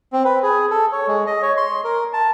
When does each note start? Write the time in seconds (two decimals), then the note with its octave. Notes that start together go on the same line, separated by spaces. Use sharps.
0.13 C4
0.25 B4
0.43 G#4
0.70 A4
0.92 C#5
1.08 G#3
1.27 D#5
1.42 C#5
1.57 C6
1.84 A#4
2.13 A5